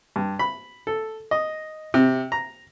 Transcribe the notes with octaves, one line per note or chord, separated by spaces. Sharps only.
G2
B5
A4
D#5
C3
A#5